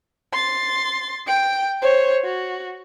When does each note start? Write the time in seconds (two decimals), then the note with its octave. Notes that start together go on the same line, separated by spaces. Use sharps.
0.32 C6 A6
1.27 G5 D7
1.82 C5 C#5
2.24 F#4